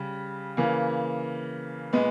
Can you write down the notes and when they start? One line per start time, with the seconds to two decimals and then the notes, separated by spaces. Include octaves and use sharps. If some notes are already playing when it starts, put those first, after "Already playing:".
Already playing: C#3 G3
0.57 C#3 E3 A#3
1.93 A#2 G#3 B3